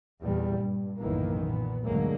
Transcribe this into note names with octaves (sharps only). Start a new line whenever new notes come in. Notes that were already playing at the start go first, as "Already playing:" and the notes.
E2 A#2 G3
G2
F#1 B1 A2 D#3 E3 A#3
A#2 B3
D2 G2 D3 F#3 G#3 A#3